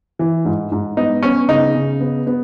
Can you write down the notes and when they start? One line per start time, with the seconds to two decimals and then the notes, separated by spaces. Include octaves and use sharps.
0.19 E3
0.45 G#2
0.72 G#2
0.97 B3 D#4
1.23 B3 C#4
1.49 C#3 D#4
1.75 C#3
2.00 B3
2.27 B3